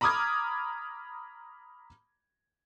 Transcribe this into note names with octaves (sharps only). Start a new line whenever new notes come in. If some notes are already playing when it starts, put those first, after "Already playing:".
A#5 B5 D6 D#6 F6 G#6